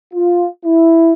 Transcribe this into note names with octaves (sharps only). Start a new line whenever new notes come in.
F4
E4